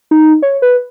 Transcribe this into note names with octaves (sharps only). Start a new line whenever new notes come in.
D#4
C#5
B4